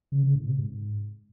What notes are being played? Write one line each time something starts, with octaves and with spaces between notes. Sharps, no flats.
C#3
C#3
A2
C3
G#2